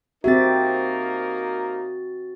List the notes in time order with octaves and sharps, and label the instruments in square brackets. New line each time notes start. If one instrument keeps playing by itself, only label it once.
[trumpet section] A#3 D#4 A#4 [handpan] C4 G4 E5 [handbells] F#4 A6